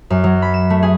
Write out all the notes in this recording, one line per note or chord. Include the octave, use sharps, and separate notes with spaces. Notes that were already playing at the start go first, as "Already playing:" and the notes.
F#2
F#3
B5
E7
A3
G#4